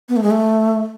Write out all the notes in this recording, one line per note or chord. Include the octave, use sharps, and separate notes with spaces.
B3
A3
G#3
A3